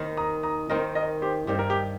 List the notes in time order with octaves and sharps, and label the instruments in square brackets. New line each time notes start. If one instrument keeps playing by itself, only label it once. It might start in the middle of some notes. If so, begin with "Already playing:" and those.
Already playing: [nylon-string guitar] D#2 D#3 C4
[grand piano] A#5 D#6
A#5 D#6
[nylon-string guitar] D#2 D#3 C4 [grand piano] A#4 D#5
[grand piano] A#4 D#5
G4 C5
[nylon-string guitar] G2 D#3 C4 [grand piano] G4
[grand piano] A#4
G4